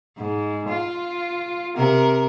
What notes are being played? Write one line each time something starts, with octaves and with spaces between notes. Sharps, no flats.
G#2
F4
C3 A#4